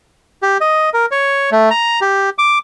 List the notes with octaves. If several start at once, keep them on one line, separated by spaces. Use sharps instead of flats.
G4
D#5
A#4
C#5
A3
A#5
G4
D6